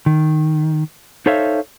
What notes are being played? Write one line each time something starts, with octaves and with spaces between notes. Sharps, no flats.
D#3
D#4 A4 C5 C#5 E5 F5